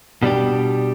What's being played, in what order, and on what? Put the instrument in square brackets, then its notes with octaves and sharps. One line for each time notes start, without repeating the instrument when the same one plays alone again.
[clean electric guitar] B2 G3 D4 G4